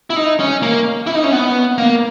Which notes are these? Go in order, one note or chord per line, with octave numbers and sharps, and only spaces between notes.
E4
D#4
C#4
A#3
E4
D#4
C#4
B3
A#3